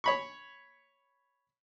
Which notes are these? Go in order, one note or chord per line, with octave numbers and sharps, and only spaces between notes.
C#5 B5 C#6